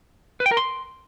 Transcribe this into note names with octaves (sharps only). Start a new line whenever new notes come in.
B4
G5
A#4
C6